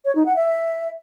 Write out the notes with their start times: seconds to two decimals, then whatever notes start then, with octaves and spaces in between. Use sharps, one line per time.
0.05 C#5
0.15 D#4
0.26 F#5
0.36 E5